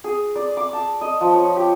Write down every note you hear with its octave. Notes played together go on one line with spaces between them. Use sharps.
G#4
D5
D6
A5
D#5
F3
C#5
G4